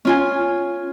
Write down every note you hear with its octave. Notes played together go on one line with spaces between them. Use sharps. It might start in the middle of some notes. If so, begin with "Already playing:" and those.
C#4 F4 G#5